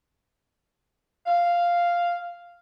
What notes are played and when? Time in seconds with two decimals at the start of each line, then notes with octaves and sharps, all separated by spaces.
1.26 F5